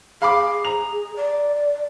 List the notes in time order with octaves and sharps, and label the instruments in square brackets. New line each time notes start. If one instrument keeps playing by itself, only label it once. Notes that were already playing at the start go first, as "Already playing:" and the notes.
[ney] G#4 [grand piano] F5 B5 D6
[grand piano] A#5 F7
[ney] D5